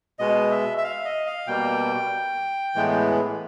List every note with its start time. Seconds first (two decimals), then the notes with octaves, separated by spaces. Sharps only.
0.19 B2 G#3 B3 D#5
0.51 E5
0.78 E5
0.84 F5
1.05 D#5
1.26 F5
1.47 B2 G3 A#3 G5
2.75 A2 E3 G#3 B3